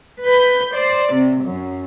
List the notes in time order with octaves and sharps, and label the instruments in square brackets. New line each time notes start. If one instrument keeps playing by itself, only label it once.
[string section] B4 G6
C5 D5
C3
F#2